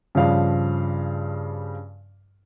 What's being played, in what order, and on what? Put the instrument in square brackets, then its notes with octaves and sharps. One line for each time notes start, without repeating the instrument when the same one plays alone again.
[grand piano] G2 C#3 F3 F5